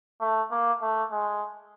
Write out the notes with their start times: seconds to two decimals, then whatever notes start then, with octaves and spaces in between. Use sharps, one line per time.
0.20 A3
0.51 A#3
0.82 A3
1.12 G#3